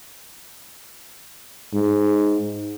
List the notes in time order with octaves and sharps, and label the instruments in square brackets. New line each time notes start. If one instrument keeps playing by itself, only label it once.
[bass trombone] G#2